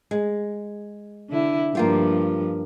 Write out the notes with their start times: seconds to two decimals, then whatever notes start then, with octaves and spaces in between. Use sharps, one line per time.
0.11 G#3
1.30 D3 E4
1.75 G2 F3 A#3 F4 G4